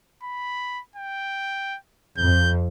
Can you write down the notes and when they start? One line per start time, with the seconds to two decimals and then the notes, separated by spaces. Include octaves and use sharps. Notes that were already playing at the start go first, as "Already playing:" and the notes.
0.23 B5
0.95 G5
2.18 F2 G6